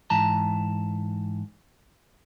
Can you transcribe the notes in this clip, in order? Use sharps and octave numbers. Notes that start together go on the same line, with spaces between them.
G#2 E3 A5 A#5